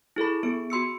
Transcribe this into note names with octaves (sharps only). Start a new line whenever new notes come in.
E4 G#4 A4 B5
B3 G#4 D7
F#4 C6 E6 C#7